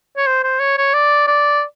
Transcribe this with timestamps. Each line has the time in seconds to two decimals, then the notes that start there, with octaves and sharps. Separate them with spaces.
0.17 C#5
0.27 C5
0.44 C5
0.60 C#5
0.78 C#5
0.94 D5
1.27 D5